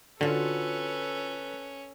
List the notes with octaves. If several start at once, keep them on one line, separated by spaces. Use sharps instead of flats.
D3 C#4 F4 F#4 A4 B4